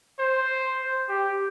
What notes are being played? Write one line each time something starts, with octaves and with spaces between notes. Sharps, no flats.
C5
G4